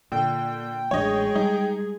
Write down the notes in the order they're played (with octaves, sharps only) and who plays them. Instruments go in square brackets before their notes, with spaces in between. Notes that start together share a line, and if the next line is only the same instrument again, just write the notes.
[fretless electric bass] A#2 [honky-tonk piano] D3 [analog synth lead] G5
[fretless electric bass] A1 F#3 D4 [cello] G#3 G#4 [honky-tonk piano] C#5 D#5
[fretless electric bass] G3 [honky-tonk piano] D#4